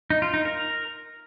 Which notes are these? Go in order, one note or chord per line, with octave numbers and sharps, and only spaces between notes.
D#4
F4
D#4
A#4